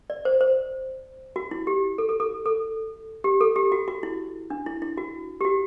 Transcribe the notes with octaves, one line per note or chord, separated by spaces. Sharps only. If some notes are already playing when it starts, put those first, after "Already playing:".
D5
C5
C5
F#4
E4
G4
A4
A4
A4
A4
G4
A4
G4
F#4
F#4
E4
D4
E4
E4
F#4
G4
F#4